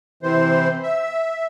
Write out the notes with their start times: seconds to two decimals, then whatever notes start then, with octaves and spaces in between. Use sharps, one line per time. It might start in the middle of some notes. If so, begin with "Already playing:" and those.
0.23 C3 E3 C5
0.83 E5